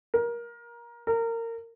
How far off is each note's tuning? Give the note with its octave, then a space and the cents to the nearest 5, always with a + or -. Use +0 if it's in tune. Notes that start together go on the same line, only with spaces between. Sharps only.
A#4 +20
A#4 -25